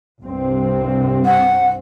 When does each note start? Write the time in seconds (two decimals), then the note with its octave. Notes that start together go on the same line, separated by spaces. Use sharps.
0.23 C2 G2 C4
1.26 F#5